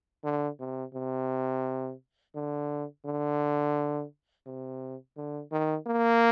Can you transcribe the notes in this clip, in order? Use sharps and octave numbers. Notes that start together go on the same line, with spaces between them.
D3
C3
C3
D3
D3
C3
D3
D#3
A#3